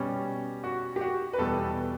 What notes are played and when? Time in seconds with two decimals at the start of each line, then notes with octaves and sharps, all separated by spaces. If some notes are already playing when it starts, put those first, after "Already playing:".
Already playing: B2 G3 C#4
0.64 F#4
0.96 G4
1.01 F#4
1.33 B4
1.38 E2 B2 G3 A4